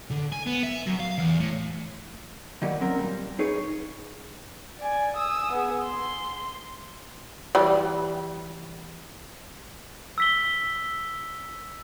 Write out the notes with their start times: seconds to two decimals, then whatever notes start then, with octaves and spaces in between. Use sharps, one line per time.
0.10 D3
0.32 G#5
0.46 B3
0.63 E5
0.87 F#2
1.00 F5
1.18 E2
1.40 A2
2.62 D#3 E3 F#3 G3 A#3
2.81 F#3 C4 C#4 A#4
2.98 A#2 G3
3.39 D#4 G#4 B4 C#5
4.79 D5 G#5
5.16 D#6 E6
5.53 B3 G#4
5.84 C6
7.55 E3 G3
10.18 E6 B6 G7